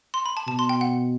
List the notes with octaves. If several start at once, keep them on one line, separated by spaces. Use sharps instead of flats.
C6
B5
A5
B2 A5
C6
G5
F#5